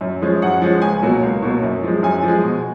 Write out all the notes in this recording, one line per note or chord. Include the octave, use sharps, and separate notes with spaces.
F#2
F3 G#3 C#4
F#2 F#5
F3 G#3 C#4
C#2 G#5
B2 F#3 A#3
C#2
B2 F#3 A#3
F#2
F3 G#3
F#2 G#5
F3
G#3
B2